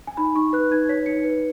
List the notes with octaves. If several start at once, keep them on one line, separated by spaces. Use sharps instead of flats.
G#5
D#4 B5
D#4 C#6
B4 F#6
D#4 G#6
C#5 B6
D#4 C#7
B4